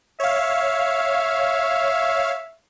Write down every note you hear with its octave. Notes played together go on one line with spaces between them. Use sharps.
C#5 E5 F5